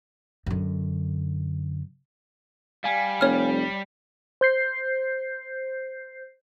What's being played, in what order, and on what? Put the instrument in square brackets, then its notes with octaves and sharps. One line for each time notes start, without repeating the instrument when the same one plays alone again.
[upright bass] F#2 D3
[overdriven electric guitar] G3 [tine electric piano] F5 G#5
[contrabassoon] F1 [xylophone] C#5 F6
[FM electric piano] C5 G6 C7